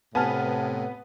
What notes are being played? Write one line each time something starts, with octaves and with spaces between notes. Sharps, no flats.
A2 C3 B3 G#5 A5 F6